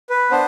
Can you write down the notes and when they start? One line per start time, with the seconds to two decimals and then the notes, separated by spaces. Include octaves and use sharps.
0.10 B4
0.31 B3 D4 C5